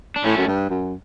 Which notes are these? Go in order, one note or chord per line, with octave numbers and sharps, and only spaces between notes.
D4
A2 A3 C#4
F#2
G2
F#2